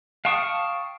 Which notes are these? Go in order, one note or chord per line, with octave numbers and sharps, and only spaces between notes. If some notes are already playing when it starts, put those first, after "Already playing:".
F5 G5 A5 C#6 D#6